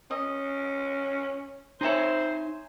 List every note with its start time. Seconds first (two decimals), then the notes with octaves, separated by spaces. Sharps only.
0.11 C#4 D#5
1.81 C4 D#4 C5 C#5 E5 G#5 A#5